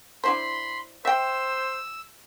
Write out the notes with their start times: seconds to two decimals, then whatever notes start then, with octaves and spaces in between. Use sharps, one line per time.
0.24 D4 E4 C5 B5 C6
1.05 C5 E5 G5 E6